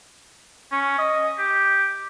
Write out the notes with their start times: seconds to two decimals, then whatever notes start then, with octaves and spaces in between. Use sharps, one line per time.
0.72 C#4
0.98 D#5
1.38 G4